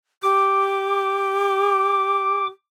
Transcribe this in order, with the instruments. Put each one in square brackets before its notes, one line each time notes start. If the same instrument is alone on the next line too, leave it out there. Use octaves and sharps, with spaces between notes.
[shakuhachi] G4 [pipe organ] D6